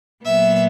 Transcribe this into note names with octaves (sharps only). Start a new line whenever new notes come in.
A#2 F#3 B3 E5